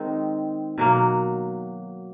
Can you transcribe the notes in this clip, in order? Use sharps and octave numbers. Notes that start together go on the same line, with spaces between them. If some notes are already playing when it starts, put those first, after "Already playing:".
Already playing: D#3 G#3 C4 D#4
B2 F#3 A#3